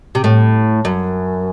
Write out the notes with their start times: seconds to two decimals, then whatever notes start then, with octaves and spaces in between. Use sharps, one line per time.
0.15 C3
0.24 A2
0.85 F#2